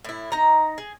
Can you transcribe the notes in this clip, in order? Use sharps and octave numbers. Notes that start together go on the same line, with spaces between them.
A2 E4
D#4 A#5
G#4